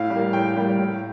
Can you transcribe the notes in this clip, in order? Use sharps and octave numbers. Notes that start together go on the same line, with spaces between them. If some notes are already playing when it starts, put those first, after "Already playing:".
Already playing: A2 F5
G3
A#3
A2 G5
G3 A#3
A2